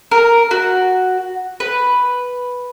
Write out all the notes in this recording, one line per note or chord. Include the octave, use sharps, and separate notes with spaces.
A#4
F#4
B4